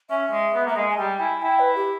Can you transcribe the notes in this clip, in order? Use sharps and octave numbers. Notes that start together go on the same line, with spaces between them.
C#4 E5
G#3
B3
A#3 E5
G#3 D#5
G#5
G3 G5
E4 G#5
E4 G5
B4
G4